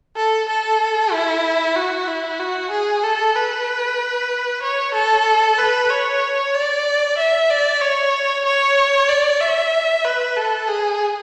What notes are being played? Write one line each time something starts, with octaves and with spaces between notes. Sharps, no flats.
A4
A4
E4
F#4
E4
F#4
G#4
A4
B4
C#5
A4
B4
C#5
D5
E5
D5
C#5
C#5
D5
E5
B4
A4
G#4